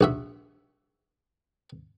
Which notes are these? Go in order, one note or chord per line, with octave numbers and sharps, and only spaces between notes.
A#1 F#4 E5